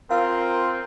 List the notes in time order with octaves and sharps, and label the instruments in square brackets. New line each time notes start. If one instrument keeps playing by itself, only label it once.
[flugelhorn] C4 [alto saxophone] F4 [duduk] A#4 [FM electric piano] F5